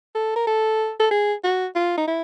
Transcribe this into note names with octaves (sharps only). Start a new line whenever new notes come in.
A4
A#4
A4
A4
G#4
F#4
F4
D#4
E4